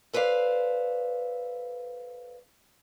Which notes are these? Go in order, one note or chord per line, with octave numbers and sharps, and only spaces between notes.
A4 B4 C5 D5 F5